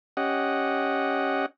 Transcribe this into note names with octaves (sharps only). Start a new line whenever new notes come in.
C#4 G4 D#5 F#5